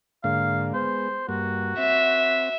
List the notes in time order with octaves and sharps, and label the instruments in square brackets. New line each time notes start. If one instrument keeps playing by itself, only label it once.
[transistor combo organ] G#2 D3 A#3 [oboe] F5
[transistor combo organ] G#3 B3 [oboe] C5
[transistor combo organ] G2 A#3 [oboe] F#4
[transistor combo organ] C4 [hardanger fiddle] E5